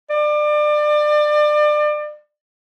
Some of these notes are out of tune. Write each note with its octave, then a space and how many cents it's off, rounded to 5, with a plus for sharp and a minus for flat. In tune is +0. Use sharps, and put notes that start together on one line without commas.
D5 +30